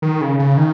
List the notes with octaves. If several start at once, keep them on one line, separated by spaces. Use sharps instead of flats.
D#3
C#3
C#3
D#3